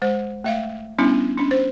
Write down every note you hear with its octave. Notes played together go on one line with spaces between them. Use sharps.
G#3 C5
A3 E5 F5
G3 B3 C#4 D4 E4
C#4 D4
C5